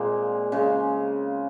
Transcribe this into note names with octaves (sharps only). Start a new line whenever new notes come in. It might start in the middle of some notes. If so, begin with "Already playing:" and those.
Already playing: A#2 G#3 A#3 C4
C#3 G#3